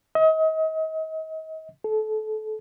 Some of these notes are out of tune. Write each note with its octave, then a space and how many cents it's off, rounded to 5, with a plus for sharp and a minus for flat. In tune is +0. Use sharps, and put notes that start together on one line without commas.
D#5 +35
A4 -25